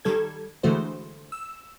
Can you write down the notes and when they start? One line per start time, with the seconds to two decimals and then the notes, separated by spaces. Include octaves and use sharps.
0.05 D#3 G3 A4 G#6
0.63 D3 E3 G#3 A3 F#4 C5
1.32 E6